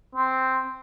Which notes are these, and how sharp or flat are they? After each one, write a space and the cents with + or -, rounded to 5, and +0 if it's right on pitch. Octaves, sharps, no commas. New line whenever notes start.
C4 -5